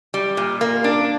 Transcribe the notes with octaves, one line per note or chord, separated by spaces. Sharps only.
G3
A#2
A#3
D4